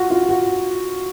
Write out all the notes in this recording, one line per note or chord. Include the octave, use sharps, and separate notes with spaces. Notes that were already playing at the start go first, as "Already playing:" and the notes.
Already playing: F4 F#4
F4
F#4